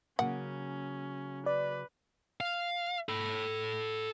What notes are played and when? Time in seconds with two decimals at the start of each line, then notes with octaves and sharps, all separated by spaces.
0.19 C#3 F#3 A#3 C#4 F#5
1.46 B4 D5
2.41 F5
3.09 A4 B5